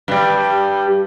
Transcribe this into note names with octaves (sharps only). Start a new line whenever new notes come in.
G2 G3